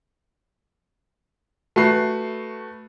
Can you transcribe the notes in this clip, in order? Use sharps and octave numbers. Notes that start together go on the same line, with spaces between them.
A3 F#4 B4 C7